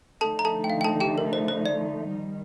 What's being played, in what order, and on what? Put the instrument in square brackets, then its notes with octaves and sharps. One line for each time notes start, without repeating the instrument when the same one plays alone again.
[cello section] D3 F3 A3 D#4 [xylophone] A4 A5
[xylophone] A#5
A4 A5
G5
F5
G5
A4 A5
G4 G5
A#4
C5
C5
D5
[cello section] D#3 G3